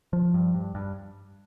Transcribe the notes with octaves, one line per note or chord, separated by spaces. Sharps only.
F3
G2
G2
G2